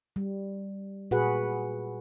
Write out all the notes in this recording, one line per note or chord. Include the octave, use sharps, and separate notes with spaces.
G3
A#2 F#4 G#4 B4 F#5